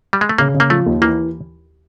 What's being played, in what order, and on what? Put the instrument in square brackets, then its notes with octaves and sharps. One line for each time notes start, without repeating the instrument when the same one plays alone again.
[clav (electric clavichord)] G3
G#3
A3
[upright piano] C#3 [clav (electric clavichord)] A#3
[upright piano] C#3
[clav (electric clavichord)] A#3
[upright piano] F3 [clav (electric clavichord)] A3
[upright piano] D#2
[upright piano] E3 [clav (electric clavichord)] A#3